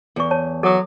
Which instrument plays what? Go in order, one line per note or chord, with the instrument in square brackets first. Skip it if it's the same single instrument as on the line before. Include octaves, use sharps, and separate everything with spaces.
[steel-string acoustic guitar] E2 [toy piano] A4 C#6
[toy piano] C#5 A5
[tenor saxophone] F#3 [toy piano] A4 D#6